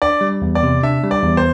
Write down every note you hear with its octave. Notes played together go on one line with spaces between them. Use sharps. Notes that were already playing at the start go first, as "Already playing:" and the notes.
D4 D5
G3
E2
D5
C3
D4 E5
G3
D5
E2
C5